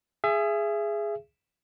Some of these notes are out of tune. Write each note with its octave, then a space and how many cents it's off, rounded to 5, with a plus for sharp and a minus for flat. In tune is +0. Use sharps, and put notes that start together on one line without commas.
G#4 +0 E5 +30